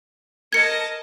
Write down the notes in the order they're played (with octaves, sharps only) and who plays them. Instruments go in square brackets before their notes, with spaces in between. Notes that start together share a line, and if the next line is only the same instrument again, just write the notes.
[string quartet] A#4 D#5 A5 [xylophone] G#6 C#7